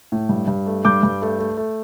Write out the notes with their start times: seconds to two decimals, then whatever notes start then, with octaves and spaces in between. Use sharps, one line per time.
0.12 A2
0.29 G2
0.48 G2
0.66 A3
0.85 G2 D6 G6
1.03 G2
1.22 A3
1.39 A3
1.57 A3